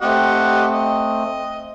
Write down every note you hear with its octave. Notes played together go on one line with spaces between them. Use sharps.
A3 C4 G4 D#5 F#5
D#5